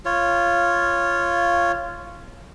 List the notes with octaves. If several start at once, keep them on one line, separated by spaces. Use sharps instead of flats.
F4 C#5